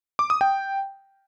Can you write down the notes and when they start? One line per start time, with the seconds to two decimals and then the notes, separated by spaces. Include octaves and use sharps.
0.19 D6
0.30 D#6
0.41 G5